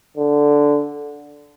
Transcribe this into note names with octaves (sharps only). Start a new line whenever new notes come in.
D3